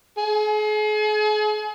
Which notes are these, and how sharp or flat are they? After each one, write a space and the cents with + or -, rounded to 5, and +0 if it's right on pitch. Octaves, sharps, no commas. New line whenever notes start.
G#4 +40